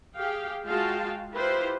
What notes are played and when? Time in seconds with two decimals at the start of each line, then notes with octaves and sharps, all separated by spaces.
0.15 G4 G#4 F5 G5
0.65 G#3 F4 F#4 F5 G5 A5
1.32 E4 F4 G4 B4 C5